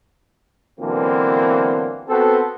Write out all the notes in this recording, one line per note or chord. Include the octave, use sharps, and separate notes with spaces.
B2 D3 E3 F#3 A#3 C4
B3 C4 F#4 A4